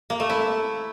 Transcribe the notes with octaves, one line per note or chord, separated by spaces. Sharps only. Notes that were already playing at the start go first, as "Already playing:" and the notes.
A#3
A3
E4